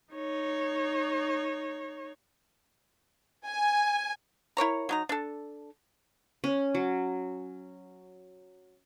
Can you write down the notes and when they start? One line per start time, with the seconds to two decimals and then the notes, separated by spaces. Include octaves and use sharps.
0.14 D#4 C#5
3.46 G#5
4.57 E4 A#4 C#5 A#5
4.89 F#3 D#4 A#5
5.09 D4 A4
6.44 C#4
6.75 F#3